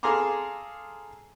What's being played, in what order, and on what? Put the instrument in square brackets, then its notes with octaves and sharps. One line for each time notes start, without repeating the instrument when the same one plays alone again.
[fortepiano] G#4 A4 F5 A#5 C6 D6